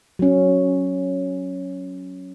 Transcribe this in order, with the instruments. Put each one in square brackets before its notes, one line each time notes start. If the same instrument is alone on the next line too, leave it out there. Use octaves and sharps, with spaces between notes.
[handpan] F#3 C#4